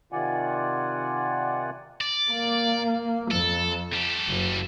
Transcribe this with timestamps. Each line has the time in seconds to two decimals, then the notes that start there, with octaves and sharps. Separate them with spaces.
0.12 C3 D#3 F4 D5 F#5 G#5
2.01 D5
2.31 A#3
3.31 F2 A4
3.93 G3 A4
4.27 F#1